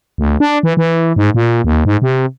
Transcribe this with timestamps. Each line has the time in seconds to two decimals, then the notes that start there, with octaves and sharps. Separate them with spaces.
0.18 D2
0.40 D4
0.63 E3
0.77 E3
1.16 G#2
1.34 A#2
1.64 D#2
1.85 G#2
2.02 C3